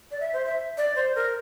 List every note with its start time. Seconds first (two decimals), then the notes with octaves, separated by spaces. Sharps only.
0.11 D5
0.20 E5
0.33 C5
0.46 E5
0.78 D5
0.96 C5
1.15 A#4